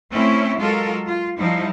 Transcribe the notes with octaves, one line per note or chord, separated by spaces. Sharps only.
A3 C4 C#4 E4
F#3 G#3 F4 A4 A#4
F4
F3 G3 D#4 E4